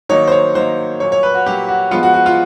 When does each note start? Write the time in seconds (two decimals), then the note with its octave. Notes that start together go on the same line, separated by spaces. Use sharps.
0.09 D#3 F#3 A#3 D#4 C#5
0.28 C5
0.32 C#5
0.54 D#3 F#3 A#3 D#4 C5
1.00 A#2 F#3 A#3 C#5
1.12 C#5
1.23 B4
1.35 F#4
1.46 A#2 F#3 A#3 G4
1.68 F#4
1.91 F3 G#3 B3 F4
2.03 F#4
2.14 F#4
2.26 F4